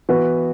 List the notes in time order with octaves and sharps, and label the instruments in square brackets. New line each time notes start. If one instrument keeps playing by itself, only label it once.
[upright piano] E3 B3 F#4 B4